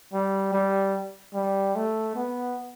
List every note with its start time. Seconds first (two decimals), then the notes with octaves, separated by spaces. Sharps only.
0.13 G3
0.53 G3
1.34 G3
1.76 A3
2.15 B3